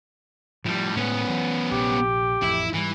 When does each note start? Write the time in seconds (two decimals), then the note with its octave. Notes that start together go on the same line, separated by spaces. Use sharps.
0.65 A2 F3 G3
0.96 A2 G#3 B3 C#4
1.29 E3 F#3
1.71 A#1 C3 G4
2.43 A1 F2 E4
2.74 G#2 C3 E3 G3